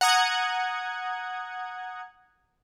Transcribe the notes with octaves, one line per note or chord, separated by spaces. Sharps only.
F#5 A#5 D#6 G#6